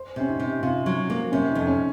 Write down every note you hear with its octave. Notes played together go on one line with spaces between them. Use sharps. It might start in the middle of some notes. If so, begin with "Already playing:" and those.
Already playing: C5
C3 C#4
D#4
C3
C3 F4
F#3
A#3
C3 C#4
D#4
F2
C#4